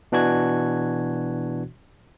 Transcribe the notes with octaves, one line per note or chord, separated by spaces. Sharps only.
B2 E3 D4 F#4 F#6 G#6